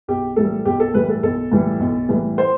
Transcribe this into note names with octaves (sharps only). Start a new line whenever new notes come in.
B1 G4
A2 E3 G3 A4
B1 G4
A4
A2 E3 G3 B4
A4
B1 A4
A2 E3 G3
B1
A2 E3 G3
C5